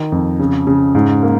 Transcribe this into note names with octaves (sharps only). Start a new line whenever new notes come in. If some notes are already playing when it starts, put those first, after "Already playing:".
Already playing: D#3
F2
C#3
C#3
G#2
A#3